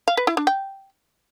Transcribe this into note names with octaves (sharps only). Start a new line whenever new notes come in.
F5
B4
E4
D4
G5